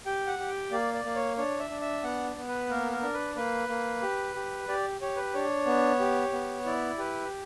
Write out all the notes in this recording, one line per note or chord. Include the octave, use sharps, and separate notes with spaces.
G4 G5
F#5
G4
G5
A#3 D5
D5
A#3
C#5
D4 C#5
E5
D4
E5
B3 F#5
B3
B4
A#3 A#4
A#4
D4
B4
A#3 B4
A#3
G4
G4
G4 D5
G4 C#5
B4
D4 C#5
B3
G4
B3
E4 D5
G4 B4